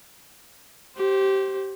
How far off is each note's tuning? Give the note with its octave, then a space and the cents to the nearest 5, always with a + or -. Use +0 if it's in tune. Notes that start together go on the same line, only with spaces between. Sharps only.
G4 -20 C5 +15